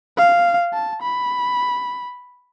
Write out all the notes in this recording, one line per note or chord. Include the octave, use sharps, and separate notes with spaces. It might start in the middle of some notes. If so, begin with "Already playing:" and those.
F5
A5
B5